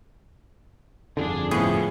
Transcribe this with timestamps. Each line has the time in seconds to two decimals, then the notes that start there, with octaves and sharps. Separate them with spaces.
1.17 G1 F2 D3 D4 G#4
1.51 A2 F3 B3 C#4 G#4